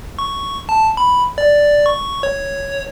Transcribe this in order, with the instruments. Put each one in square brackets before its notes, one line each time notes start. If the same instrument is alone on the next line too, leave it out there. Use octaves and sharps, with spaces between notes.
[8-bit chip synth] C#6
A5
B5
D5
C#6
C#5